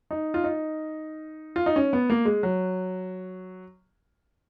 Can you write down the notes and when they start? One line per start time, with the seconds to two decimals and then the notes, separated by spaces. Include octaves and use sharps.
0.11 D#4
0.34 F4
0.44 D#4
1.56 F4
1.66 D#4
1.76 C#4
1.93 B3
2.10 A#3
2.25 G#3
2.43 F#3